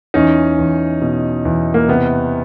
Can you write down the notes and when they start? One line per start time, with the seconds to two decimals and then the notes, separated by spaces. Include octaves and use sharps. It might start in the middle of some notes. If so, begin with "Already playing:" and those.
0.14 E2 C#4 D#4
0.58 E2
1.02 B2
1.45 E2
1.74 A#3
1.88 C3 B3